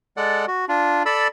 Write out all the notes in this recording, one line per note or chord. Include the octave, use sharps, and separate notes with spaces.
G#3 A4 D5 F#5
F#4
D4 F4
A4 D5 B5 E6